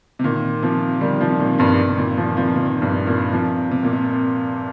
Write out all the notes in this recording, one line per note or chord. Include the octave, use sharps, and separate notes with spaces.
C3
A#2 D#3
C3 F3
D#3 G3
C3 F3
A#2 D#3
G2 C3
C3
A#2 D#3
C3 F3
C3 F3
A#2 D#3
G2 C3
A#2
C3 F3
C3
A#2
C3